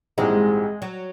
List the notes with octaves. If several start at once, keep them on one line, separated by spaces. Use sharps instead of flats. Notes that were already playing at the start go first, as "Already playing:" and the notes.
A#1 G#2 E3 G3 G#3 C4
F#3